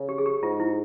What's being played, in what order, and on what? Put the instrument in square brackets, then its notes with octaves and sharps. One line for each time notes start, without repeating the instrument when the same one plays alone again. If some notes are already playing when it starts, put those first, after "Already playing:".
Already playing: [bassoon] C#3
[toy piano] G4
G#4
G4
[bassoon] G#2 [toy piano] F4
[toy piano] E4